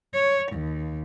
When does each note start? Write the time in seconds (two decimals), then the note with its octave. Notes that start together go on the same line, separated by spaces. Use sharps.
0.13 C#5
0.52 D#2